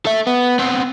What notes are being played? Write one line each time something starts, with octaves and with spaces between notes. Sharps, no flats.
A4 E5
B3
B3 C4